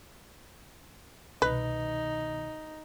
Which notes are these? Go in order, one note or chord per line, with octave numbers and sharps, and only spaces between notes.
C2 B2 D#3 D#4 B4